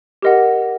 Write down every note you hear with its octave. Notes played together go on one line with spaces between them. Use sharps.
G4 A#4 D#5 F#5